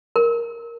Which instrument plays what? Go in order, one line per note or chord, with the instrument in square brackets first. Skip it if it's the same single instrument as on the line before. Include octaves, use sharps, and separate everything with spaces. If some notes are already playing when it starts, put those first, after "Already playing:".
[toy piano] A#4